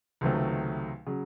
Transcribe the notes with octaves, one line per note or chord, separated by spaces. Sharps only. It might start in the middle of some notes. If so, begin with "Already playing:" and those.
C#2 C3 D#3 F#3 A3
C#3 F#3